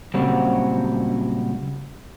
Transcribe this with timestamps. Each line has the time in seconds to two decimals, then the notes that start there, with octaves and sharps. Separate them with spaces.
0.14 A#2 C#3 F#3 G3 C4 F#4